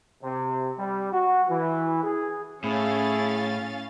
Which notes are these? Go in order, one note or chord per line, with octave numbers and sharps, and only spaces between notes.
C3
G3
F#4
E3
G#4
A2 C#4 E4 G#4 F5 A6